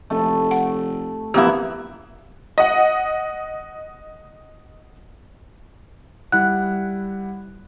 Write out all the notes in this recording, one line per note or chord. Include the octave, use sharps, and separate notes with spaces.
F1 A3
F#5
E1 F2 A#3 B3 E4 G4
D#5 F#5
G3 E4 F#5 F#6